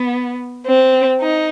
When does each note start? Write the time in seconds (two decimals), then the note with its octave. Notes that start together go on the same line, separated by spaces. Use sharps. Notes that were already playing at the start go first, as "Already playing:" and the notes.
Already playing: B3
0.66 C4
1.21 D#4